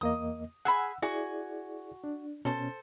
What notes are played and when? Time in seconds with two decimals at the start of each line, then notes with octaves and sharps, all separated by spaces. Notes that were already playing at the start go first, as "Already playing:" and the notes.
0.01 E2 A#3 D#5 D#6
0.65 G#4 F#5 G#5 B5 E6
1.02 E4 F#4 G#4 D5 G#5
2.04 D4
2.45 B2 C#4 A4 C5 A5